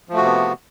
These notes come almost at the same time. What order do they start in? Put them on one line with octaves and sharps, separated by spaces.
F3 A3 F#4 C3 B3